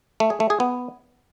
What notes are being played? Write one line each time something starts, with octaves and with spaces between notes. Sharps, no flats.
A3
G#4
A3
G#4
B3